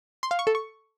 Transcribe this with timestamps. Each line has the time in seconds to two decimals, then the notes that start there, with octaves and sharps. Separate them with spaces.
0.23 C6
0.31 F5
0.39 C#6
0.47 A4
0.55 C#6